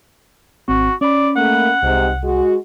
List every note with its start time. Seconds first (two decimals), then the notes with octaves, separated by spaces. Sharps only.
0.68 G#1 C4 F#4
1.01 C#4 D5 B5
1.36 A3 A#3 F#5
1.83 C2 G#2 C3
2.24 G#3 F#4